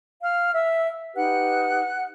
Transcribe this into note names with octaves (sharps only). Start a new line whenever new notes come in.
F5 F6
E5 E6
D#4 G4 B4 F#5 F#6